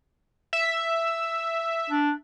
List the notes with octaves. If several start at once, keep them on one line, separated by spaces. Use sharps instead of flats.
E5
D4